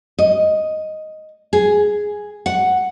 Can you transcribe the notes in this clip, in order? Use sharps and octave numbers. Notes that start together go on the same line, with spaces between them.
D#5
G#4
F#5